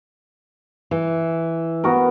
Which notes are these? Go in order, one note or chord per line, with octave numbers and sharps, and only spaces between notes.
E3
B3 F#4 A#4